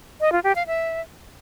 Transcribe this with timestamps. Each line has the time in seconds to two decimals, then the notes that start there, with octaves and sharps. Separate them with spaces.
0.21 D#5
0.32 F4
0.44 G4
0.56 F5
0.67 E5